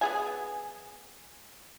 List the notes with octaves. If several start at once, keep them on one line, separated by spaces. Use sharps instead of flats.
B3 G#4 G#5